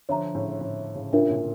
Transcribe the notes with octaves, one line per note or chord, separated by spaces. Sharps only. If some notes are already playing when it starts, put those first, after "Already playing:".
D3 F3 C#5 E5 A#5
A2 C#3
A2
A2 C#3
A2 C#3 D4 F4 A#4 E5
A#2 D3